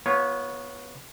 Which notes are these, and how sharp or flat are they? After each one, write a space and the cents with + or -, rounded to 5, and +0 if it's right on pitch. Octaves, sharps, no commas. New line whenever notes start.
B3 -20 F4 +0 C#5 +0